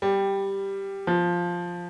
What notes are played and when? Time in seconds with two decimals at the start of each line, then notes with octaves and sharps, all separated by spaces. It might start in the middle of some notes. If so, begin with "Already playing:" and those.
0.02 G3
1.07 F3